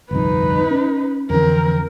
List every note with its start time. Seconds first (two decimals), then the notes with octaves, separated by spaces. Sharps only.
0.11 G1 C2 F2 D#4 B4
0.71 C#4
1.30 F2 D3 E3 C4 A#4